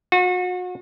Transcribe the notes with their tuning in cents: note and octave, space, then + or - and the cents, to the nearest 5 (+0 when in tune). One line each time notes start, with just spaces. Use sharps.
F#4 -35